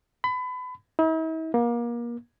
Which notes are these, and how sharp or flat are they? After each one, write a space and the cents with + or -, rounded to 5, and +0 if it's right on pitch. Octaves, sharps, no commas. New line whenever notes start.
B5 +30
E4 -45
A#3 +30